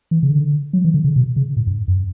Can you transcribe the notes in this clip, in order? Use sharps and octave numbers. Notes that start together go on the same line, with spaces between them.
E3
C#3
D3
F#3
E3
D3
C#3
B2
C#3
A2
G2
F#2